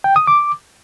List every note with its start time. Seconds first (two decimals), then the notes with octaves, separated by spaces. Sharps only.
0.04 G5
0.16 D#6
0.27 D6